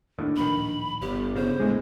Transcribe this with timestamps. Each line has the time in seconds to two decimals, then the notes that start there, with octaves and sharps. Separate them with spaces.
0.19 D#2 A2 D4
0.36 D1 A#1 D#3 B5
1.01 G1 B3 G4
1.36 C#3 C5
1.60 D2 A2 G#3